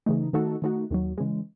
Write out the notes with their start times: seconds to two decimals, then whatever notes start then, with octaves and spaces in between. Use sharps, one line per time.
0.06 C#3 E3 A3 D#4
0.33 D#3 A3 D#4 F#4 A4
0.62 D#3 A3 D#4 F#4
0.91 D#2 D#3 F#3
1.18 C#3 E3 G#3